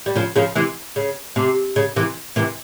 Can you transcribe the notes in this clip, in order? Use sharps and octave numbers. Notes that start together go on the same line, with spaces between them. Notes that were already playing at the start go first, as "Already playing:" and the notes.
G3
C#3 F3
C#3 F3
C3 E3
C#3
C3
C#3
C3 E3
C3 E3